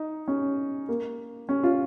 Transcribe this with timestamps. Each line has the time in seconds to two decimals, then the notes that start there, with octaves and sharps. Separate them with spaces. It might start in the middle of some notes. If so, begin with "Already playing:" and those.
Already playing: D#4
0.28 C#4
0.89 A#3
1.49 C#4
1.63 F4